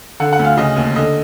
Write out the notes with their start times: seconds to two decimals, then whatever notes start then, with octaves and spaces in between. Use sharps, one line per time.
0.20 D3 F#5
0.33 F#5
0.39 D2
0.45 F5
0.57 C#3 D#5
0.76 D#2
0.96 D3 D#5